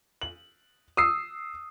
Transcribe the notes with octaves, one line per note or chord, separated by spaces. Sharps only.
F#7
D#6 E6 C7